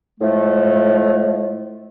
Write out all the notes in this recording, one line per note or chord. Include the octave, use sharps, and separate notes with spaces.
A2 F3 G#3 A3